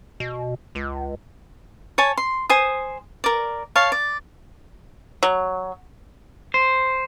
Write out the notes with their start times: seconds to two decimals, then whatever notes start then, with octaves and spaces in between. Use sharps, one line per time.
0.20 B2
0.75 C#2
1.98 C#5 G#5 A5
2.18 C6
2.50 C5 G#5 D#6
3.24 A#4 D5
3.76 C#5 F5 A5
3.92 D5
5.23 F#3
6.54 C5